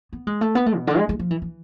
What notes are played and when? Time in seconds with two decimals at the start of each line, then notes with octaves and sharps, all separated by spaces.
0.13 B3
0.27 G#3
0.41 A3
0.55 B3
0.66 A3
0.77 B2
0.87 D3
0.98 G#3
1.09 G#3
1.19 F3
1.31 E3
1.42 E3